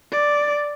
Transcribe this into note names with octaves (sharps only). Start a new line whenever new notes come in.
D5